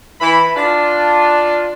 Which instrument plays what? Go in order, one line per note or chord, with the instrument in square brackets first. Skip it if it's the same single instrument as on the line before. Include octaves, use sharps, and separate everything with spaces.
[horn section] E3 B5
D4 F4